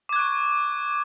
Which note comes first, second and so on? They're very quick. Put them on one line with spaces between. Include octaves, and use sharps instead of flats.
D6 G#6 F#6 C#6